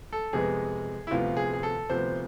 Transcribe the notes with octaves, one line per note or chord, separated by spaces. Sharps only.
A4
F2 C3 G#3 B3 G#4
E4
D2 C3 F3 B3 F4
G#4
G#4
A4
D2 C3 F3 B3 C5